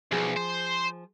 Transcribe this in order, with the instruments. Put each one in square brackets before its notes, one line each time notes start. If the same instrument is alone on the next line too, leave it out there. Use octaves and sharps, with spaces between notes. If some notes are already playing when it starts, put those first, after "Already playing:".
[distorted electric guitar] B1 [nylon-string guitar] F3 G#4
[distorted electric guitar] C5